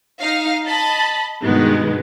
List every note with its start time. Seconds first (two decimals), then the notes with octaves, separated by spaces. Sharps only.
0.20 D#4 F5
0.65 D#5 A5 B5
1.43 G2 B2 D#3 G#3 B3